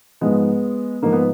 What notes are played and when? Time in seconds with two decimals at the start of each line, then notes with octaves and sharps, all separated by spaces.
0.21 G#2 F3 G#3 B3
1.02 G#2 F3 A#3
1.13 B3